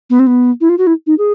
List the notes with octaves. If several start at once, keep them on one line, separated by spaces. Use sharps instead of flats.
B3
C4
B3
E4
F4
F#4
E4
D#4
G#4